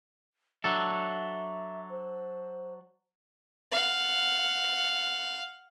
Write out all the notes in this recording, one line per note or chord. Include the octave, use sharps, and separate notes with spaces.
F#3 D4 A4 E5
C5
F5 F#5